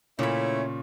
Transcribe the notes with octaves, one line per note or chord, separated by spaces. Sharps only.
A#2 C#3 A3 C#4 E4 C#5 B5